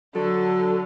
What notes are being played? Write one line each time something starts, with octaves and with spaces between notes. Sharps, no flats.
D3 F#3 A4